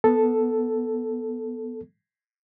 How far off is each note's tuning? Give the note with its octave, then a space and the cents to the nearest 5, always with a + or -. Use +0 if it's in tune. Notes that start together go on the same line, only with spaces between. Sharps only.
B3 -5 A4 +0